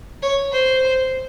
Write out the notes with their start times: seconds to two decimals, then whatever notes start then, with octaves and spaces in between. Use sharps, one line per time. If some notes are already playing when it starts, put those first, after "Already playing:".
0.22 C#5
0.52 C5